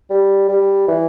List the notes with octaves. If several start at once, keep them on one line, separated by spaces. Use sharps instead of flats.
G3
G3
E3